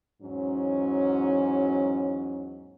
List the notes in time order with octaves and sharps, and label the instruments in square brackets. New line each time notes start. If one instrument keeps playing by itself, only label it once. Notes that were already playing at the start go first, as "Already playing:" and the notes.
[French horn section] E2 G#2 F#3 C#4